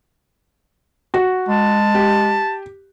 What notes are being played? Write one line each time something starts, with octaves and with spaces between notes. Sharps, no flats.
F#4
G#3 A5
G4